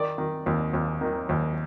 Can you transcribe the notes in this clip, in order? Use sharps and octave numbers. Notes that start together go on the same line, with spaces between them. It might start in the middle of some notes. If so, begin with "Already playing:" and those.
Already playing: D#3 D5
D#3
D#2
D#2
D#3
D#2